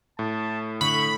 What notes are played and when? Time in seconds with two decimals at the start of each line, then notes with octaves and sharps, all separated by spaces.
0.19 A2 A5
0.81 D3 B5 C#6